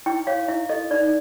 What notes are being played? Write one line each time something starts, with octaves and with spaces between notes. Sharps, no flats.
E4 G5
C#5 F5
E4 E5
A4 D#5
D#4 D5